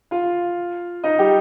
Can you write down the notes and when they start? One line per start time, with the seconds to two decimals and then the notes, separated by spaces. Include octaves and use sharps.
0.11 F4 F5
1.04 D#4 D#5
1.19 G3 G4